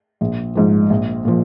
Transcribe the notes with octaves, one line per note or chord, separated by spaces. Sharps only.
A#1
G#2 F3
A#1
A#2 F3